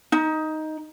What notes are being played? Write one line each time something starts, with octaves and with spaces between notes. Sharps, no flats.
D#4